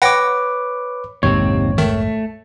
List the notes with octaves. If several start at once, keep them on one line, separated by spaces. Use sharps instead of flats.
B4 C#5 F#5 G5 D6 A#6
F1 A#1 D#2 G#2 C3 C4 C#5
D#3 A3